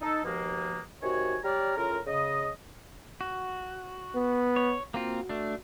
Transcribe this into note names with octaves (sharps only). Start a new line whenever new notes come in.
D#4 A4
D#2 B2 F3 G#3 A#3
C3 D#3 F#4 C#5 G#5
G3 G4 C#5 D5 A#5 F6
A2 C#3 F4 A#4
C#3 D#5
F#4
B3
C#5
A#3 C4 F4 F#4
A3 D4